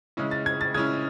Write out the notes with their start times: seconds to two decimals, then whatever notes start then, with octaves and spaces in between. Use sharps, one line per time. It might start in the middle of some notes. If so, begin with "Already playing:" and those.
0.17 C#3 G#3 C#4 E4
0.31 A6
0.46 G#6
0.61 A6
0.74 C#3 G#3 C#4 E4 G#6